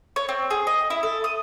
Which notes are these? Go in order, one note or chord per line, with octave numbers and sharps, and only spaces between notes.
C#5
C4
G#4
D#5
E4
A4
D#6